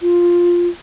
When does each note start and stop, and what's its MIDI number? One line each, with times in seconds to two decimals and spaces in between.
0.01 0.68 65